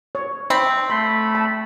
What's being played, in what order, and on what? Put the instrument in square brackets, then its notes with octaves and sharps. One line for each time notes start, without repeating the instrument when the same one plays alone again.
[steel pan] C#5
[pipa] C4 [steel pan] B5
[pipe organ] A3 B5 [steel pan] C6
[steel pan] A5